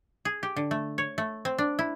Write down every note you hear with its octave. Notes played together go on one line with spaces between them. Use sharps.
G#4
G4
D3
A3
C#5
A3
C4
D4
E4